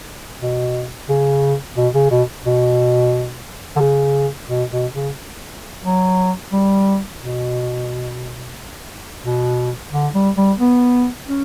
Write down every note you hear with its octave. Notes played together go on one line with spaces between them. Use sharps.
B2
C#3
B2
C#3
B2
B2
D3
C#3
B2
B2
C#3
F#3
G3
B2
B2
D3
G3
G3
B3
C#4